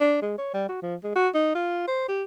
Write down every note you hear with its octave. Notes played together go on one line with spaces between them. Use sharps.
D4
G#3
C#5
G3
F#4
F3
G#3
F#4
D#4
F4
C5
G4